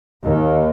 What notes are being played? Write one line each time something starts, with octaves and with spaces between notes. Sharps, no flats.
D#2